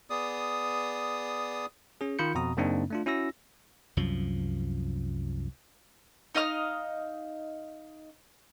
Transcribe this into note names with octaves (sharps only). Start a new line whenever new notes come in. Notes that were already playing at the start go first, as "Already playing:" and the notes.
B3 G#4 D5 D#6
C#4 G#4
D#3 F4 B5 G6 C#7
F2 B2 A#5 D#6
F#2 C#3 A#3 C4 D4 D#4
A3 D4 F4
C#4 E4 F#4 E6 A#6
C2 F#2 F3
D#4 D#5 F5 F6